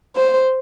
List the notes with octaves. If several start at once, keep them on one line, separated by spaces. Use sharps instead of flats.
C5